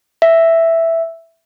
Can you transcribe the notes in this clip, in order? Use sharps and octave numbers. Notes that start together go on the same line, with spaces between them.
E5